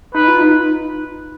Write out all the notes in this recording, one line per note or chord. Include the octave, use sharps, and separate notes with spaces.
D#4 B4
F4
D#4